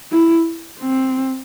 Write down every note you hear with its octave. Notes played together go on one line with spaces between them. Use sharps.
E4
C4